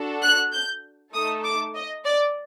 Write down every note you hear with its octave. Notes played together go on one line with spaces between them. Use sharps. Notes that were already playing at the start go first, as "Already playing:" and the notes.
Already playing: D4 F#4 A4
F#6
G6
A3 D#4 A4 D#6
D6
D#5
D5